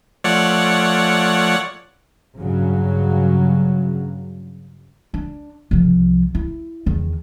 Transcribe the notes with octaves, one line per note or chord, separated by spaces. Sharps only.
F3 A3 C#5 D5 F#5
G2 C#3 F#3
D4
C2 F3
E4
E2 D#3